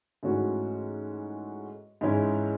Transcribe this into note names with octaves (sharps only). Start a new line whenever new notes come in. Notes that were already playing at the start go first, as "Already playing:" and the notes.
G#2 E3 A3 C#4 F#4
G#2 E3 G#3 C#4 E4